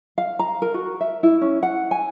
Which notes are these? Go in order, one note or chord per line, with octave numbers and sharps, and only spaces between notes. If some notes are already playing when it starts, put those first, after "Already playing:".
F5
A#5
A#4
F#4
E5
E4
C#4
F#5
G#5